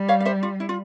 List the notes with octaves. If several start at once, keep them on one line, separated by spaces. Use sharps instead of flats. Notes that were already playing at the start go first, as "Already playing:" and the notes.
Already playing: G3
C#5 F5
F5
C5 E5
F4
E4
F4